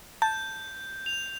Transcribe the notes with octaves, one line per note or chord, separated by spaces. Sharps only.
A5 G6
F7